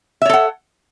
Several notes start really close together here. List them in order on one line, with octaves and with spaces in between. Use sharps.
E5 C#5 A4 F#5